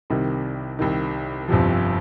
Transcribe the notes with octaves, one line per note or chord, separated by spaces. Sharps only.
C2 C3 D#3
C2 C3 D#3
G1 F2 C3 F3